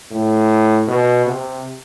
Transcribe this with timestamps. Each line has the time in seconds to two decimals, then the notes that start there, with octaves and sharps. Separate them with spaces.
0.11 A2
0.88 B2
1.26 C3